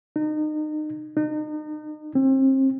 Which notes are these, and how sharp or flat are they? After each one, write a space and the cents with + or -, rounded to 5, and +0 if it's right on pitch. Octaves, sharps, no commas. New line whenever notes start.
D#4 -30
D#4 -35
C4 +35